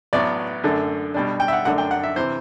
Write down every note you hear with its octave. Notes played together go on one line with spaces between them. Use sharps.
A1 A2 F#3 B3 D5
F#2 D3 A3 D4
B2 G3 D4
G5
E5
F#5
F#2 D3 A3 D4 F#5
G5
F#5
E5
C3 E3 C5